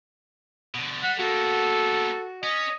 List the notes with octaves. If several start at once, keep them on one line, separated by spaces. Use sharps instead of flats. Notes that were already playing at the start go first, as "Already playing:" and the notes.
B2 D3
G3 F#5
A#3 B3 F#4 A4
C#4 D#5